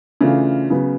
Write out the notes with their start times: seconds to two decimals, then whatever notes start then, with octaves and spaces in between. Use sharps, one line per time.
0.21 C#3 E3 A3 D4 F4
0.70 C#3 F#3 B3